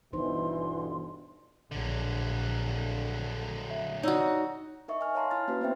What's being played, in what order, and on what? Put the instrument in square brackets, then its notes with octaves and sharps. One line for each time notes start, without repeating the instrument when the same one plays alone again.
[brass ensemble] G1 B2 [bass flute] E3 [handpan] D4 D#4 C5 [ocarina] C6
[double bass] A#1 [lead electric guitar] D3 F#3
[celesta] E5
[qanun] D#4 F#4 [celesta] C#5 D5 E6
[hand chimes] D#4 A#4 D#5 E5 C#6
G#5 F6
C#5 F5 A5 A#5 C6
E4 F6 A6
A#3 C#4 F#4 B4
B3 C4 C5 E5 G5